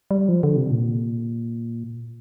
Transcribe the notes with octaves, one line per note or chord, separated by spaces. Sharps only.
G3
F3
D3
C3
A#2